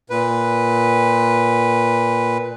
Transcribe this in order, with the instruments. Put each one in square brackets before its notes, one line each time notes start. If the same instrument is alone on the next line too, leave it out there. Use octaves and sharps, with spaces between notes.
[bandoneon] A#2 B4